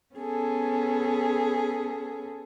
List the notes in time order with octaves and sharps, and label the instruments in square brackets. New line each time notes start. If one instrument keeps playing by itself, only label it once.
[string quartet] B3 C#4 G#4 A4